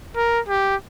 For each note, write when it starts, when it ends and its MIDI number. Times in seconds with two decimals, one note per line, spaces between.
0.16 0.40 70
0.48 0.75 67